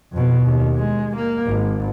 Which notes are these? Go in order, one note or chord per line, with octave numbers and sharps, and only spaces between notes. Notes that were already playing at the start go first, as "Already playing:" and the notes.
F2 B2
D#2
G#3
A#3
G#1